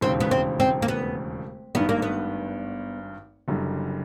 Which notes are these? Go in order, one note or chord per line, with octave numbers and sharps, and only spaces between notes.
E1 D#2 C#3 C4
B3
C4
C4
A#3
B3
G#1 G2 D#3 B3
A#3
B3
F#1 F#2 D3 G3